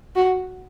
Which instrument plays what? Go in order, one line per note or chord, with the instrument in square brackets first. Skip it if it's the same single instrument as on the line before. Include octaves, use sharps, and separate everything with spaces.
[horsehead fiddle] F#4